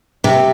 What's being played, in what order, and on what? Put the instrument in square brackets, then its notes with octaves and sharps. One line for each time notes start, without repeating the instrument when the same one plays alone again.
[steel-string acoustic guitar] C3